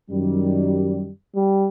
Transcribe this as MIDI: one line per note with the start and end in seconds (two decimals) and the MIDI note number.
0.10 1.08 42
0.10 1.08 51
0.10 1.08 55
1.36 1.69 55